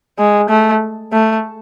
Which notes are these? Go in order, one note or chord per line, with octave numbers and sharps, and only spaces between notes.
G#3
A3
A3